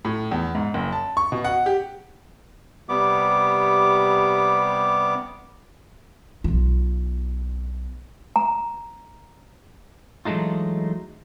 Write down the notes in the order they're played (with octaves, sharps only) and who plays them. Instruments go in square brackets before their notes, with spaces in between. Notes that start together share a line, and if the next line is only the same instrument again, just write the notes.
[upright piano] A2
E2
G#2
F#1
A5
C#6
B2
F#5
G4
[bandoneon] C3 G3 B3 D6
[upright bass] B1 F4
[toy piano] A#5
[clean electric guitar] E3 F#3 G#3 A3 D#4 F4